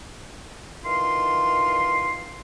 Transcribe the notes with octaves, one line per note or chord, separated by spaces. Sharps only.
D#3 E3 F4 C6